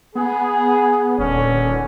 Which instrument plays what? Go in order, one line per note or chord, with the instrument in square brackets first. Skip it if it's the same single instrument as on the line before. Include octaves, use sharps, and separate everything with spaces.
[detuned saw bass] B3 [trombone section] G#4
[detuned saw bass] D#1 [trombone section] D3 B3 C#4